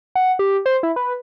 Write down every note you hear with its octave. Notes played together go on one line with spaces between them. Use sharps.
F#5
G4
C5
E4
B4